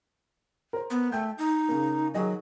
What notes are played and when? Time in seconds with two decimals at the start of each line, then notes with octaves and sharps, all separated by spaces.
0.73 A#4 C5
0.90 B3
1.12 A3 G5 G6
1.38 D#4
1.69 C#3 A#3
2.14 D#3 F#3 G#4 D#5